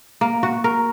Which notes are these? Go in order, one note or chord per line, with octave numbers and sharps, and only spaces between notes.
A#3
F#4
A#4